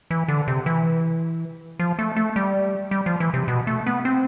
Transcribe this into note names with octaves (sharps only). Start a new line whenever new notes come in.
E3
D3
C3
E3
F3
A3
A3
G3
G3
F3
E3
C3
B2
A3
B3
C4